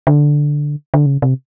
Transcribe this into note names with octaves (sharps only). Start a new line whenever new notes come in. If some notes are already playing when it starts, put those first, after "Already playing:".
D3
D3
C#3
C3